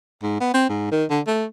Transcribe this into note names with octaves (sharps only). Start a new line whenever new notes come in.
G#2
B3
C4
G#2
D#3
D3
A3